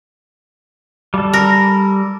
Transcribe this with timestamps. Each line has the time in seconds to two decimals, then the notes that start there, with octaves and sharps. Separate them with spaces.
1.14 G3 A4
1.33 A#4